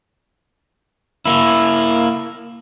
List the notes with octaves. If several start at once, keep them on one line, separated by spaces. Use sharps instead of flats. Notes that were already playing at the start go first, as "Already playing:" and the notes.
A#3 E4